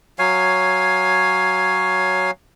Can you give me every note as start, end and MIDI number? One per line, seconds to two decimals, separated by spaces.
0.19 2.31 54
0.19 2.31 73
0.19 2.31 77
0.19 2.31 80